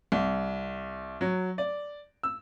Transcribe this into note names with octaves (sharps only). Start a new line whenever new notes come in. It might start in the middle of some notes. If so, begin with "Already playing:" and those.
C2
F#3
D5
E6